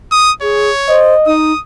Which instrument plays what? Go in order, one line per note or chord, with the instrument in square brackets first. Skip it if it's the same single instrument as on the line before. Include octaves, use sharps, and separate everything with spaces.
[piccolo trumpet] D#6
[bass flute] G#4 [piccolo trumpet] C#5
[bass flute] C5 [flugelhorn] D#5
[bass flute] D#4 [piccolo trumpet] D#6